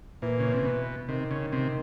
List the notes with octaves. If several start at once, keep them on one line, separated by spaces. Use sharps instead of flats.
A#2 E3
C#3
C3
B2
C3 D#3
C#3
C3